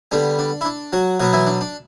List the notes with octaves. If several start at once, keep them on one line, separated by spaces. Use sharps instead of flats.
D3 G3 B3 D4
D4
E4
D4
F#3 F#4
B2 F#3 B3 F#4
E3 E4
D4
D4